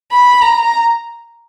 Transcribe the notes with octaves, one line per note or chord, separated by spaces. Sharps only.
B5
A#5